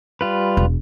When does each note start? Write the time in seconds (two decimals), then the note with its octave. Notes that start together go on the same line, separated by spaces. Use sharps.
0.21 G3 F4 B4
0.57 E1